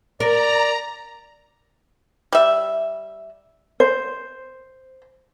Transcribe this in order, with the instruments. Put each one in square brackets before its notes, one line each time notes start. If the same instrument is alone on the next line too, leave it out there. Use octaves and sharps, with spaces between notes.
[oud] A#4 [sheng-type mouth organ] D5 [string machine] A#5
[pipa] G3 E5
[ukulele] C5